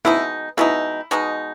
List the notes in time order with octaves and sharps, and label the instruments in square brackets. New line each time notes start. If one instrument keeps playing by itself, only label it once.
[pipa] B2 G#3 D#4 [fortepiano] E4
[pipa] B2 G#3 D#4 [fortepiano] E4
[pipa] B2 G#3 D#4